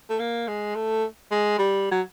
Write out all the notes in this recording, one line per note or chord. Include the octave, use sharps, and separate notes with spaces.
A3
A#3
G#3
A3
G#3
G3
F#3